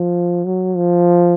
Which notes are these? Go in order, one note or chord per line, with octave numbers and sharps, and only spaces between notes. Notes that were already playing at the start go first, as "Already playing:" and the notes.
Already playing: F3
F#3
F3